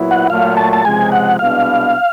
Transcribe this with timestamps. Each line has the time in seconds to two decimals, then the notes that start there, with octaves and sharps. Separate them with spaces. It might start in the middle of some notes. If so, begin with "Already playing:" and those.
Already playing: A#2 F#3 B3 E4
0.11 F#5
0.30 A#2 F#3 A3 F5
0.57 A5
0.73 A5
0.84 C#2 C3 F3 G#3 G#5
1.12 F#5
1.39 C2 B2 G#3 B3 D4 F5